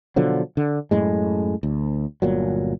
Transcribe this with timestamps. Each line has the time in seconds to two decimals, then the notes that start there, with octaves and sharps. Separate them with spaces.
0.16 B2 D3 F3 F#3
0.57 D3
0.91 F#2 A2 G#3
1.63 D2
2.22 G1 A#2 F#3